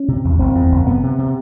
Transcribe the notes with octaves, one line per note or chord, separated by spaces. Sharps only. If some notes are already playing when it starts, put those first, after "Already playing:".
Already playing: C#4
C3
E2
F#1 C4
E2
F#1
C3 B3
C3
C3